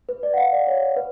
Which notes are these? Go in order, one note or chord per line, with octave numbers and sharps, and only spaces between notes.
B4
D5
F#5
F5
D5
C#5
B4